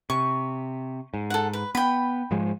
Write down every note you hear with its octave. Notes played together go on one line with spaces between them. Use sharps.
C3 C#6
G#2
A4 F#5
B4
B3 G5 B5
G#2 F3 G#3